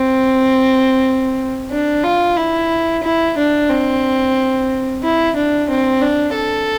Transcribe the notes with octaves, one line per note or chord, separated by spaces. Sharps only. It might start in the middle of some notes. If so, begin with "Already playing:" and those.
Already playing: C4
D4
F4
E4
E4
D4
C4
E4
D4
C4
D4
A4